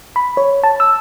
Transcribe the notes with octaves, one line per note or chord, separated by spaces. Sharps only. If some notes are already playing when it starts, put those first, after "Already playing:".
B5
C#5
A5
E6